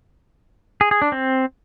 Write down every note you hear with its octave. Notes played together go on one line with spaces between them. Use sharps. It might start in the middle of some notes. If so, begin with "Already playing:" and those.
G#4
G#4
D4
C4